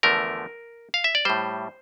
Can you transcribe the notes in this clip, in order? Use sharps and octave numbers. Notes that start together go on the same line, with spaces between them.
E2 D3 F3 A3 A#4
F5
E5
D5
A2 G3 C5